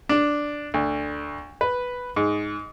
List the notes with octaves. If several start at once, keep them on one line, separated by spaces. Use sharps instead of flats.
D4
D2
B4
G#2